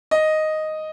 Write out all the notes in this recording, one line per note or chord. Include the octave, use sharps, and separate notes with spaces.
D#5